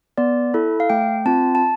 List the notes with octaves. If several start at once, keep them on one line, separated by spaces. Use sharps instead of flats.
B3 D5
E4 A4
F5
A3 G5
C4 F4 A5
A5